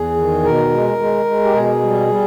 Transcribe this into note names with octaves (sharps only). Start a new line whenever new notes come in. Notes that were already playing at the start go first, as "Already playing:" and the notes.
Already playing: E2 G#4
D#3
B2 A#4
G#3
G#3
G#3
G4
B2 G#4
G3
G3